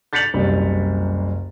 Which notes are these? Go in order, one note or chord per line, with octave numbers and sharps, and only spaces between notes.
G6 A6 B6 C#7 F7 F#7
F#1 C2